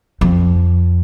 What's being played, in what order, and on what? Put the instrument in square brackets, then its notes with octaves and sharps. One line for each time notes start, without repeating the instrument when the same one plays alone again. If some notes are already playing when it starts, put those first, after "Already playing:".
[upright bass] F2